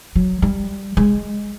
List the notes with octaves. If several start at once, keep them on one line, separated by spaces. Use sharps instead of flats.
F#3
G3
G#3